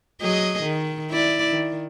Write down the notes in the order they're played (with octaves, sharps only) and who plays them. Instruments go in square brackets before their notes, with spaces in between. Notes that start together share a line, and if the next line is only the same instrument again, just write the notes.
[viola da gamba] F#3 G#4 D#5
D#3
E4 D5
D#3